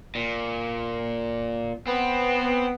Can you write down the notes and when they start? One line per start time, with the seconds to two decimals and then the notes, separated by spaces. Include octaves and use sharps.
0.15 A#2
1.87 B3 C4